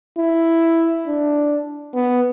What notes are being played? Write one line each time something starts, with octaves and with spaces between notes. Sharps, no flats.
E4
D4
B3